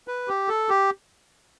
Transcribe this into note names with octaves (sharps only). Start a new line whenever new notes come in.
B4
G4
A4
G4